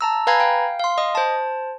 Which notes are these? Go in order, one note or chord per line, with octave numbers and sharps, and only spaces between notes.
A5 A#5 E6
B4 F5 G#5 A#5 B5 G#6
F5 G5
F5 C6
D#5 D#6
C5 A5